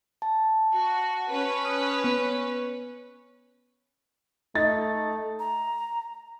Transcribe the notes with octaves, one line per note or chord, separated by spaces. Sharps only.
A5
F#4
C#4 B4
D#6 F6
B3
A3 D#4 A6
A#5